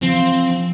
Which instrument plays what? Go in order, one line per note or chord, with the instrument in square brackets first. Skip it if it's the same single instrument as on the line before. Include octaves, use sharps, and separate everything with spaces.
[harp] F3 [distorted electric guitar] C4